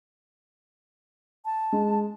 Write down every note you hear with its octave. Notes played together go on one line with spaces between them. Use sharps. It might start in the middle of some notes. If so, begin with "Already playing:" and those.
A5
G#3